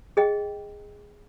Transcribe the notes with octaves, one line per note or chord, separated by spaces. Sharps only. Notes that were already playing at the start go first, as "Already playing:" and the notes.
G#4 D#5 G5